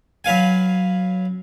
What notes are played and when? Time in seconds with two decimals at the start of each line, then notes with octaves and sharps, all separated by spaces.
0.24 F#3 B4 F5 G#5